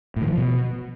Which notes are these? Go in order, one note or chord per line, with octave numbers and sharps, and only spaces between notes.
A2
D#3
E3
F3
B2